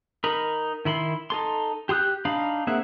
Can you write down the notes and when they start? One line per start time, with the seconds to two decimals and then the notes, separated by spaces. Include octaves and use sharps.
0.24 D#4 A#4 B5
0.85 D#3 E4 B5 C6
1.30 D#4 A4 C6
1.89 G4 C6 D#6 F#6 G6
2.25 D4 D#4 F5 B5
2.67 A#3 C4 G#4 E5 F#5